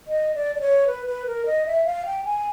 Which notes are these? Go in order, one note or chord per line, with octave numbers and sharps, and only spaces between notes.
D#5
D5
D5
C#5
B4
B4
A#4
D#5
E5
F5
G5
G#5